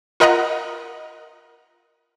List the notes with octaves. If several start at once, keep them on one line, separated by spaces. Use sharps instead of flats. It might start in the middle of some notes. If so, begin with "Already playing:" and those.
F4 A#4 D#5 F#5 A#5